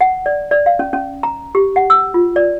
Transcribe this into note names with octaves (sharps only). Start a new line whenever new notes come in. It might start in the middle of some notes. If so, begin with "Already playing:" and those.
F#5
D5
D5
F5
C#4
C#4
A#5
G4
F#5
E6
F4
D5